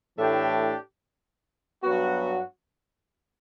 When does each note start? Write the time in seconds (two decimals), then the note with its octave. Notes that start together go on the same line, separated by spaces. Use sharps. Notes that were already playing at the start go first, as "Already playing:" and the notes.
0.17 A2 E3 A3 D4 G4
1.83 G2 F#3 B3 F#4